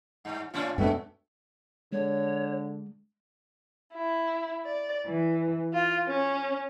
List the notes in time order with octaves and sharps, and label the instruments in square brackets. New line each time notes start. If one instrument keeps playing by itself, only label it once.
[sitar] G2
[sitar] A2 C#4 D4 [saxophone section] F4
[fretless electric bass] F#2 G#3 D4 [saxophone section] B2 A3 C4 [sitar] F#3
[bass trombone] D3 [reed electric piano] G#3 [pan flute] C#5
[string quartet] E4
D5
E3
F4
C#4